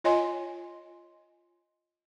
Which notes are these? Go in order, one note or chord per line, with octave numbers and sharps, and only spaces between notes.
F4 C#5 D#5 G#5 C6